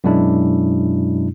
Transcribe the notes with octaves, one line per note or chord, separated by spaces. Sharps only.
F#2 B2 F#3 G#3 D4 E4